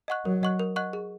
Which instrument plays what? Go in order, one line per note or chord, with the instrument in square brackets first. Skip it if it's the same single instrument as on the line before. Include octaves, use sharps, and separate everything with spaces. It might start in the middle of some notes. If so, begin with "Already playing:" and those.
[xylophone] D#5 F#5 C#6 F#6
[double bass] F#3 [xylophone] A#4
[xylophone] D#5 F#5 C#6 F#6
A#4
D#5 F#5 C#6 F#6
G#4